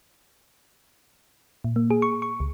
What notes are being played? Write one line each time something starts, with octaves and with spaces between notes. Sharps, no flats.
A#2
A#3
G#4
C#6
C#6
C#2